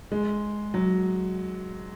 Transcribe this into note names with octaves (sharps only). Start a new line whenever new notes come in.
G#3
F#3